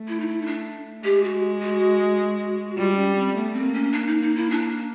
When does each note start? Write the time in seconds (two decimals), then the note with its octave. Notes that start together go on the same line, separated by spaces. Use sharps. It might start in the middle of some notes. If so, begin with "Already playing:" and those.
Already playing: A3
0.08 E4
0.20 D#4
0.27 E4
0.42 D#4
0.46 D4
1.04 G#3 G4
1.24 F#4
1.62 F#4
2.78 G3 F4
2.96 C#4
3.15 C4
3.35 A3 B3
3.54 C4
3.64 A#3
3.74 C#4
3.93 D4
4.07 D#4
4.21 D#4
4.36 E4
4.50 D4